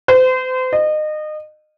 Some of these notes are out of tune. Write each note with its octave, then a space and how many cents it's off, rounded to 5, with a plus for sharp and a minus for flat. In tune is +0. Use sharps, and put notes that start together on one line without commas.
C5 -35
D#5 -25